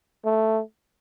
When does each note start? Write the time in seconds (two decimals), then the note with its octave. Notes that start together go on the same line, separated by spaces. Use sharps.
0.25 A3